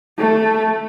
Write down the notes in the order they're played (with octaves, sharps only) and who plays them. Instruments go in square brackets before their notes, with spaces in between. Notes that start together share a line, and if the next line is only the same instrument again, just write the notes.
[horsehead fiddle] A3